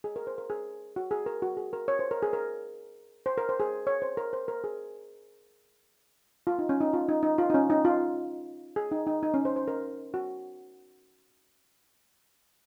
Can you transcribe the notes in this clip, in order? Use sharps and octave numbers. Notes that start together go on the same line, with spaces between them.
G#4
A#4
C5
A#4
G#4
F#4
G#4
A#4
F#4
G#4
A#4
C#5
C5
A#4
G#4
A#4
C5
A#4
C5
G#4
C#5
C5
A#4
C5
A#4
G#4
F4
D#4
C#4
D#4
F4
D#4
D#4
F4
D#4
C#4
D#4
F4
G#4
D#4
D#4
D#4
C#4
C5
C5
A#4
F#4